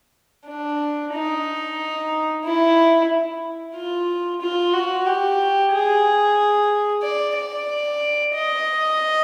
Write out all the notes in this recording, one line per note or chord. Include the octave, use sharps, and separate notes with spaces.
D4
D#4
E4
F4
F4
F#4
G4
G#4
D5
D5
D#5